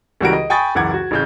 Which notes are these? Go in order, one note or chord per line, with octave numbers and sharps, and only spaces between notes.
C#2 E3 G3 F#4 A#4 D7
D#5
G5 G#5 B5 C#6 D#6 A6
C#2 F#2 E3 F#5 D6 G#6
F#4
A1 C#3 G6